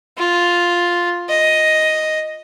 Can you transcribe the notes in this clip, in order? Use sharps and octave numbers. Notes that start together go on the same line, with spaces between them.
F4
D#5